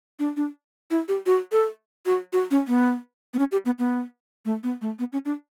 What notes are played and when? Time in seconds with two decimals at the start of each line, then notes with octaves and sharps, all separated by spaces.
0.19 D4
0.37 D4
0.91 E4
1.08 G4
1.26 F#4
1.52 A4
2.06 F#4
2.33 F#4
2.51 C#4
2.68 B3
3.34 B3
3.39 C#4
3.52 G4
3.65 B3
3.79 B3
4.45 A3
4.63 B3
4.81 A3
4.99 B3
5.13 C#4
5.25 D4